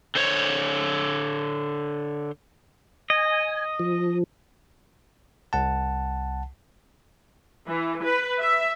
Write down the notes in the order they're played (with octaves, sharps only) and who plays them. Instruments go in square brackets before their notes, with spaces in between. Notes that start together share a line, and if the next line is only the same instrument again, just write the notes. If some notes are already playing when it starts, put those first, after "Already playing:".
[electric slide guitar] D3 C5 C#5
[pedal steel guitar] D#5 [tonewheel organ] G#5
[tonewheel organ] F3
[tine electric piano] C2 F#5 A5
[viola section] E3
B4
E5